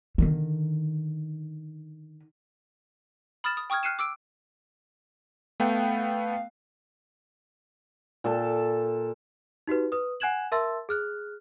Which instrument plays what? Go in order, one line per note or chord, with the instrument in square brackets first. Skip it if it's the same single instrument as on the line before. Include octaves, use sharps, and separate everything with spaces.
[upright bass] D3 D#3
[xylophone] B5 D#6 F6 A6 E7
D#6
G5 C#6 D#6 F6 G#6
F6 F#6 C7 C#7 D#7 E7
D6 E6 D7
[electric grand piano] A3 B3 G5 [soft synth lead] F5
[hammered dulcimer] A#2 A4 A5
[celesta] D#4 F#4 G4 B4
B4 D#6
F#5 G#5 F#6 G#6 E7 F#7
A#4 E5 A5 C6 E6 A6
G#4 F6 F#6